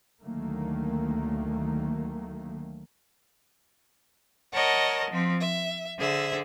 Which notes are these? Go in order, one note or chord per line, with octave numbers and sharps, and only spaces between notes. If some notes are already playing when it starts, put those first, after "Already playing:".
D2 D#3 F#3 A3 A#3
A#4 C#5 D#5 F#5 A5
F3 C4
E5
D3 G#4 C5 E5